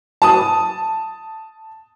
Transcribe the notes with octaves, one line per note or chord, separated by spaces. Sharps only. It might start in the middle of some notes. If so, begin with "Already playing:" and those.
A5 D#6